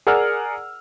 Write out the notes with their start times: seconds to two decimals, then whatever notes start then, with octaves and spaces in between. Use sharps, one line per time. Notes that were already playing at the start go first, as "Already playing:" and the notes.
0.07 G#4 A#4 D5 F#5 E6 F6